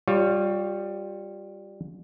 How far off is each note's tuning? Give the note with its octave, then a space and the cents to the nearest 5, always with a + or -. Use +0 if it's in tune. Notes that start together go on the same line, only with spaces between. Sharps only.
G3 +10 F4 +35 C#5 +0